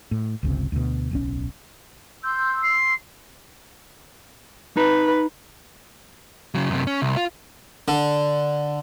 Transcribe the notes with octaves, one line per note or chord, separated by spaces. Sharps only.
A2
G1 C#2 C3
D2 B2
D1 B1 C#4
C6 E6 G6
C7
D#4 B4 A5 A#5
C#3 F#3
F#2 C3
C#4
C2
F4
D3